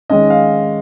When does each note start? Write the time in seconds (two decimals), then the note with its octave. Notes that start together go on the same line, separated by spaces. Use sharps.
0.10 D#3 G#3 C#4 D#5
0.30 F5